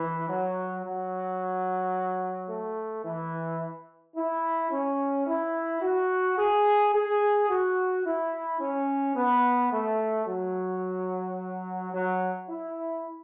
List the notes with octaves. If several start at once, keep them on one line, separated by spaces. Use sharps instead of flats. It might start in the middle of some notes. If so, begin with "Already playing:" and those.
Already playing: E3
F#3
F#3
A3
E3
E4
C#4
E4
F#4
G#4
G#4
F#4
E4
C#4
B3
A3
F#3
F#3
E4